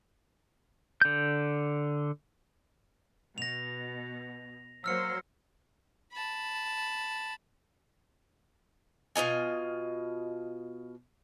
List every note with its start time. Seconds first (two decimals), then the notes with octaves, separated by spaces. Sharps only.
1.02 D3 G6
3.38 B2 A#6 F7
4.84 F#3 A#3 C5 E6 F6 C#7
6.13 A5 B5
9.16 B2 F4 D#5 G#5